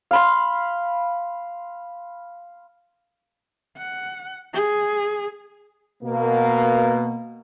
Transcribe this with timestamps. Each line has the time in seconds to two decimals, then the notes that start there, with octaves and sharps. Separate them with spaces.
0.11 F5 B5 C6
3.78 F#5
4.53 G#4
6.03 B2 A#3